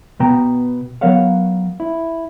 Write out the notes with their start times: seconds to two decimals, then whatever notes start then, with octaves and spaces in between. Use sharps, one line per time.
0.20 B2 B3 G5 A#5
1.01 F#3 B3 A#4 C#5 F5 F#5
1.80 E4